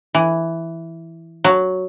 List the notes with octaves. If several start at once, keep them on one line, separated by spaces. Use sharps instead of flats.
E3
F#3